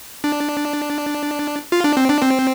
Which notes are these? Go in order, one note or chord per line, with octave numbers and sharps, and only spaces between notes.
D4
F4
D4
C4
D4
C4